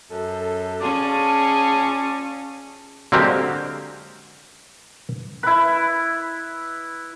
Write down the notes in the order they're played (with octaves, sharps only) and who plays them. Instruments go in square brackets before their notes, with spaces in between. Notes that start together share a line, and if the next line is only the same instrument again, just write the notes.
[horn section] F#2 A4
[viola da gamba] C#4 G#4 [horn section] F4 D5 A5
[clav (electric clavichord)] D3 F#3 G#3 A#3 C4 G4
[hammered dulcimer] E4 B4